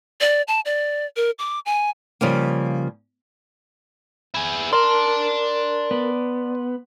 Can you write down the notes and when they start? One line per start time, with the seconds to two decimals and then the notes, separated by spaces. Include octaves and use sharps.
0.21 D5
0.48 A5
0.65 D5
1.16 A#4
1.39 D6
1.66 G#5
2.21 C#3 F3 G3 A#3
4.34 E4 G#4
4.73 A#4 D5 A5 C6
5.91 B3